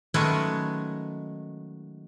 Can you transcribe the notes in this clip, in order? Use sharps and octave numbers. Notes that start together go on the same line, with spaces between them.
D#3 F#3 G#3 A3 B3 C#4